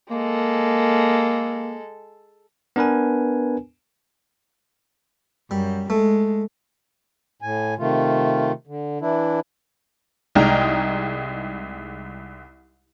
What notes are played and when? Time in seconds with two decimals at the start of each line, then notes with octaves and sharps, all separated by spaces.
0.11 G#3 A#3 A4
2.76 B3 D4 A#4 B4 G#5
5.51 F#2 G3
5.90 G#3 A3
7.42 A2 G#5
7.78 C3 D#3 A3 F4
8.67 D3
9.01 E3 D4 E4
10.35 C2 G#3 D#4 D#5 G5 F6